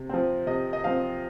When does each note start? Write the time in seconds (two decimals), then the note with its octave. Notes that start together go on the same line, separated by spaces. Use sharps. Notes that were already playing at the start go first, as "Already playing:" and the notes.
Already playing: C3
0.09 F3 C4
0.47 C3 D#5
0.73 D#5
0.84 F3 C4 F5